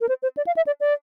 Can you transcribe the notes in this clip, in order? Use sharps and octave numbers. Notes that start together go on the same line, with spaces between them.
A#4
C5
C5
D5
F5
E5
D5
D5